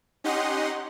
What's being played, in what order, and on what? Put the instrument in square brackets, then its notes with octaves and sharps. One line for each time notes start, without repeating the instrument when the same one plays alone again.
[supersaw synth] C#4 D#4 G4 D#5 F#5 C6